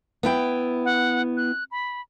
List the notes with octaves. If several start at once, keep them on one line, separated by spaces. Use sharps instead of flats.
B3 E4 G5
F#5
F#6
B5